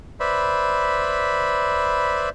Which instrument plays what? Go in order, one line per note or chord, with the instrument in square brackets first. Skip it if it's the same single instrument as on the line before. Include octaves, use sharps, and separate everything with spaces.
[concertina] B4 C5 D5 E5 B5